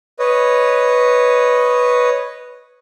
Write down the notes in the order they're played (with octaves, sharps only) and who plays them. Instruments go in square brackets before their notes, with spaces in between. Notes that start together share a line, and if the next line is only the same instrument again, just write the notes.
[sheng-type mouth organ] B4 C#5 D#5